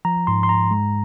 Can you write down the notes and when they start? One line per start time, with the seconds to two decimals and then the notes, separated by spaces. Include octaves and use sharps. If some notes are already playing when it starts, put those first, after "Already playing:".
0.05 F3 A#5
0.27 G#2 C6
0.43 C6
0.49 G#2 A#5
0.71 G#3